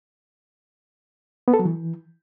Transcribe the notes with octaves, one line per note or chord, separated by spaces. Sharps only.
B3
A4
F#3
E3